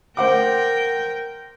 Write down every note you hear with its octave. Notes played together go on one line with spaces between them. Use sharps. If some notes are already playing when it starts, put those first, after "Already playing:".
A#4 C5 F#5 G5 D6